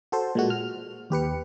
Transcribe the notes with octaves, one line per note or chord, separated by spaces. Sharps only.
F#4 A4 C5
A#2 G#3 F#4
F6
D#2 G4 B4 C#7